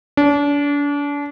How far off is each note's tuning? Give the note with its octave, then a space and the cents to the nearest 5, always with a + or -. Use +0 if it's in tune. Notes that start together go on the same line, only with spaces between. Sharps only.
D4 -35